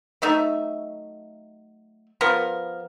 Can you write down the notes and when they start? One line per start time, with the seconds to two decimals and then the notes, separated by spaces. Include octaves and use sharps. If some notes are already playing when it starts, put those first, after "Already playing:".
0.22 F#3 A3 D#4 E5
2.21 F3 B3 A#4